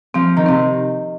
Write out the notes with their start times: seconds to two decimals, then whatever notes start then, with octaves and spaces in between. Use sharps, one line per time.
0.14 F3 C4
0.37 D#3
0.46 C3 C4